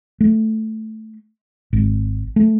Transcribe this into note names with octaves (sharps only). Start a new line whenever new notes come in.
A3
G#1
A3